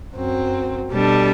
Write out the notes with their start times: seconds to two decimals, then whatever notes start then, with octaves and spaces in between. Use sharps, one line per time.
0.14 F#2 F#3 C4
0.91 B2 G3 D4 A4